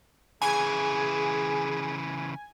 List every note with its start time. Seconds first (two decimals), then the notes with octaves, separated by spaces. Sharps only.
0.42 C#3 E3 G#4 G#5